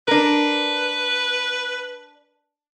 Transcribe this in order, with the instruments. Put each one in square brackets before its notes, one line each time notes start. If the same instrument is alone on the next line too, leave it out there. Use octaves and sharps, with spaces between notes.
[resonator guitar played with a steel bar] D4 A#4 [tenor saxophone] B4